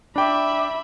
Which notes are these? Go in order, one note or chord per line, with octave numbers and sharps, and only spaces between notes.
D4 E5 G5 B5 D6